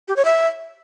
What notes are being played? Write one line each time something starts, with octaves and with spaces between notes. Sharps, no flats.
G4
C#5
E5